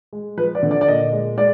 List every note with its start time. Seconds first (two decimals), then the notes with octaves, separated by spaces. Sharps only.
0.13 G#3
0.37 F3 B4
0.55 D5
0.63 D3
0.71 D5
0.81 D5
0.88 A#2 D#5
1.13 G#3
1.37 G#3 D5